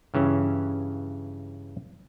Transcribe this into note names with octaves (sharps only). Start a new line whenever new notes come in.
G2 C#3 E3 C#4